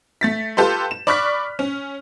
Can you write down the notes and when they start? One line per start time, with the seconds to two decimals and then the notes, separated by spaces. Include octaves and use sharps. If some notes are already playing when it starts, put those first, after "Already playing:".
0.21 A3 A6 B6
0.57 F4 G4 A4 B4 C6
0.91 E7
1.07 D5 B5 C#6 F6 F#6 B6
1.59 C#4